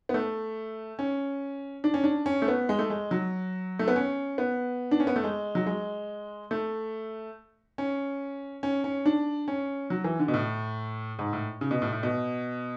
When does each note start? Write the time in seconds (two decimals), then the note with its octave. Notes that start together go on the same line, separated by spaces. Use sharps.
0.09 B3
0.14 A3
0.99 C#4
1.84 D4
1.94 C#4
2.04 D4
2.26 C#4
2.42 A3
2.48 B3
2.69 G#3
2.79 A3
2.90 G#3
3.11 F#3
3.79 A3
3.88 B3
3.96 C#4
4.38 B3
4.91 D4
5.00 C#4
5.07 B3
5.16 A3
5.24 G#3
5.55 F#3
5.66 G#3
6.51 A3
7.78 C#4
8.63 C#4
8.84 C#4
9.06 D4
9.48 C#4
9.90 F#3
10.04 E3
10.19 D3
10.28 B2
10.34 A2
11.19 G#2
11.33 A2
11.61 C#3
11.71 B2
11.82 A2
11.92 A2
12.03 B2